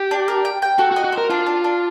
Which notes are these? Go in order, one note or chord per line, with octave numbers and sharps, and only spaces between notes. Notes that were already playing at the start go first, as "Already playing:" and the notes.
Already playing: G4
D4
A#4
G5
G5
F#4 A4
F#4
D#5
F#4
C5
A#4
D4 F4
D4
D4